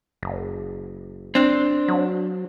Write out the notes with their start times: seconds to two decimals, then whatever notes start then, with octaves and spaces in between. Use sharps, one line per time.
0.23 F#1
1.35 C4 D4
1.88 F#3